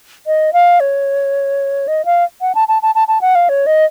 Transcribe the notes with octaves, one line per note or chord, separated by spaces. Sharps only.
D#5
F5
C#5
D#5
F5
F#5
A5
A5
A5
A5
A5
F#5
F5
C#5
D#5